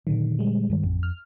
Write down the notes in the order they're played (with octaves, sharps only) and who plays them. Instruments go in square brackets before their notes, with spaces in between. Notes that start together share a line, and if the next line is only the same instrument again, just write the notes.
[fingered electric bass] A#2 D3 F#3 [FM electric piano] D#3
[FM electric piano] G3 G#3
[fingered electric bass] G2 D#3
[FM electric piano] A1 [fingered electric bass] F2
[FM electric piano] F6